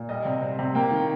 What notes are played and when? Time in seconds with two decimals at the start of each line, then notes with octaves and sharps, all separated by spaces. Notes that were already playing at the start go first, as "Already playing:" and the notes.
Already playing: A#2
0.09 G3 D#5
0.25 C3
0.42 C4
0.59 C3
0.75 A#3 G5
0.91 D#3